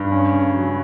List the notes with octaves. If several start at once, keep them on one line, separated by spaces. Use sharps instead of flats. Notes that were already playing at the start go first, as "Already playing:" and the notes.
Already playing: G2
C#4
C#3
F#3